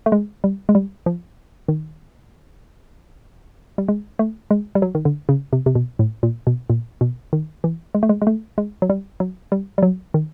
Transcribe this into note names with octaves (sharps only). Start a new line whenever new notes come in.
A3
G#3
G3
G#3
G3
F3
D#3
G3
G#3
A3
G#3
G3
F#3
D#3
D3
C#3
C3
C3
B2
A2
A#2
B2
A#2
B2
D#3
E3
G#3
A3
G#3
G#3
A3
G#3
F#3
G3
F#3
G3
G3
F#3
D#3